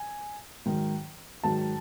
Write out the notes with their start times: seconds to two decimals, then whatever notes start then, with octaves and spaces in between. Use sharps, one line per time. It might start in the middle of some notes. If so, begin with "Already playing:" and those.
Already playing: G#5
0.66 G#2 D#3 F#3
1.43 G#2 D#3 F#3 A5